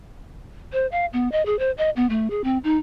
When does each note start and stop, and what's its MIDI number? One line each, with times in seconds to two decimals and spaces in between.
0.73 0.87 72
0.92 1.06 77
1.13 1.30 59
1.32 1.45 75
1.46 1.58 68
1.59 1.71 72
1.78 1.90 75
1.96 2.07 59
2.10 2.30 57
2.30 2.42 68
2.44 2.58 60
2.64 2.77 63